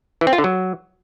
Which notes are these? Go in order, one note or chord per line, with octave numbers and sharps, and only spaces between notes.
E3
C4
F4
D3
F#3